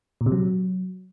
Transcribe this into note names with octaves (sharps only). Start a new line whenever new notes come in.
A#2
C3
F#3